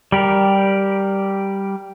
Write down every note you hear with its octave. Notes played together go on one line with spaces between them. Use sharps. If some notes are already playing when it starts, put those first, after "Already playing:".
G3 G4 A#4